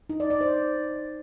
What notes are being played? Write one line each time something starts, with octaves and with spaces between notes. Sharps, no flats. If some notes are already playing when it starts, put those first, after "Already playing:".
D#4
D5
D5
C5